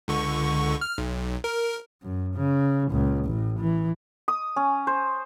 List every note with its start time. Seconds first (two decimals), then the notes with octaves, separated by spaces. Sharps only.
0.08 C#2 D3 C#6
0.81 F6
0.98 B1
1.44 A#4
2.02 F#2
2.35 C#3
2.91 C#2 A#2
3.25 A1 A2
3.59 E3
4.28 D#6
4.56 C#4
4.87 C5